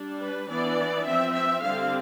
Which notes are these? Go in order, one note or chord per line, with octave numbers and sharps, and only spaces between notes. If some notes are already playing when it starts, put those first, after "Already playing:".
Already playing: G3 D4
B4
E3 B3 D4 D5
F3 C4 E5
E5
D3 G3 C4 F5